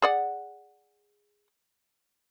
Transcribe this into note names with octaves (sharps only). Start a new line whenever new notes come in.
G#4 D5 F#5